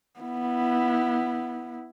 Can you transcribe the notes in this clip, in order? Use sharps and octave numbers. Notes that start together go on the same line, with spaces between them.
B3 E4